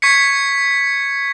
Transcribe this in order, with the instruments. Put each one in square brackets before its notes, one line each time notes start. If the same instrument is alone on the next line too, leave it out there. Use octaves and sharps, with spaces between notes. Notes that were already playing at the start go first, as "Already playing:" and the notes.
[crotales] C#6 G#6 B6 C#7